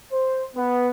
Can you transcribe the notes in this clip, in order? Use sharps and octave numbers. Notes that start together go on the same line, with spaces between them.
C5
B3